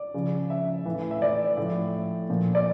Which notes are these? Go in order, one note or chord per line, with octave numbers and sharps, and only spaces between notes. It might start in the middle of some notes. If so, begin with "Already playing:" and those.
Already playing: D5
C#3 F3
E5
A2 E3
E5
D5
A2 F3
A#2 F3
D5